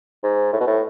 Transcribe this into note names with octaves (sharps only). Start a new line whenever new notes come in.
G#2
A2
B2
A2